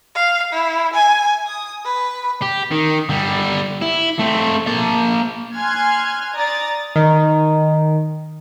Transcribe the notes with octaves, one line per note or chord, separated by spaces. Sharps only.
F5
E4
G#5
D#6
B4
G4
D#3
D3 G3
E4
A3 C4
A#3 A5
G#5 C6 F6 F#6 G#6
D5 A#5 D#6 A6
D#3